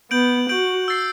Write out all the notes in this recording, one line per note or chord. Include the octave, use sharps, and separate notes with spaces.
B3 G6 D7 F#7
F#4 G6 D7 F#7
E6 A6 C7